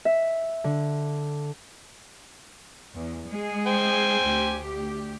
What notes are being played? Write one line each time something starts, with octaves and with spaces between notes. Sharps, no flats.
E5
D3
E2
G#3 G#4
C5 G5 G#5
D2 G4